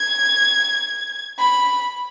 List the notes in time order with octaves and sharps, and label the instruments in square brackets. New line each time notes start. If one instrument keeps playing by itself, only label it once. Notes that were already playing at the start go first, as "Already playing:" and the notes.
Already playing: [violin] G#6
B5